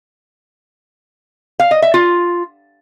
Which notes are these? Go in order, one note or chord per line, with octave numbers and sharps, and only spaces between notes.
F5
D#5
E5
F4